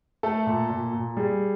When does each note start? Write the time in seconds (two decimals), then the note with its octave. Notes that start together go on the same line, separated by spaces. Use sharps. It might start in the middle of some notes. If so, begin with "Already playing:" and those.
0.23 A3 A4
0.47 A#2
0.70 A#2
0.93 A#2
1.17 G3 G#4